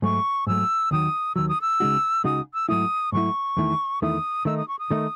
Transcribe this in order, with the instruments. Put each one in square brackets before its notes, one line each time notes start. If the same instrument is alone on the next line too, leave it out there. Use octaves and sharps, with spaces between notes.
[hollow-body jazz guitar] G#2 F#3 A3 [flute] C#6
[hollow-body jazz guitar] G#2 F#3 A3 [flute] E6
[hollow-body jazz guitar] D#2 D#3 F#3 [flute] D#6
[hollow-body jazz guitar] D#2 D#3 F#3 [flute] E6
[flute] D#6
E6
[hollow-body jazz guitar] C#2 C#3 G#3 D#4 F#4
[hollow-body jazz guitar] C#2 C#3 G#3 D#4 F#4 [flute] D#6
[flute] E6
[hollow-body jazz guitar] G#2 F#3 A3 E4 [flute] D#6
[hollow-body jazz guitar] G#2 F#3 A3 E4 [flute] C#6
[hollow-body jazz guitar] E2 D#3 A3 E4
[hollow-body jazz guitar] E2 D#3 A3 E4 [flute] D#6
[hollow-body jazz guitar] D#3 A3 D#4 [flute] E6
[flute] D#6
C#6
D#6
[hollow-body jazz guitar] D#3 A3 D#4